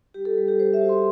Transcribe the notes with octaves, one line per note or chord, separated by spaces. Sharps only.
G3 G4
A4
G3
G4
G3 C5
E5
F#4
C6